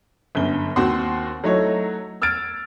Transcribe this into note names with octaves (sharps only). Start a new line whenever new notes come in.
G1 F#2 G7
D#2 C4 F#4 C6
F#3 A3 D#4 E4 A4 C#5
E6 F6 G#6 A6 D7